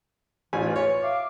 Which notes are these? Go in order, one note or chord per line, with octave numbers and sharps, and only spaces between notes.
A1 G#2 E3 F4 G#5
C#5
E5 F5 D6